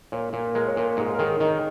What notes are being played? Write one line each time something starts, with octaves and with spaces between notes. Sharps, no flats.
A#2 C#5
A#2
G#3 A#4
C#5
A#2 A#4
G#2 G#4
A#4
D#3 G#4
D#3 D#4